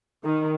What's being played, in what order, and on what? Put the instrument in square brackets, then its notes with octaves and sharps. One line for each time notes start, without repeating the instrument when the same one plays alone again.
[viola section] D#3